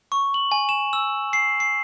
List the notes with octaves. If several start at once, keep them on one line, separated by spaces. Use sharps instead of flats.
C#6
F#7
G#5
E7
E6
C7
C7